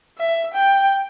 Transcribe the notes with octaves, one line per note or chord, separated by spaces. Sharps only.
E5
G5